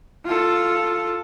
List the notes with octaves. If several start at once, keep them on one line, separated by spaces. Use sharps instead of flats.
F4 A4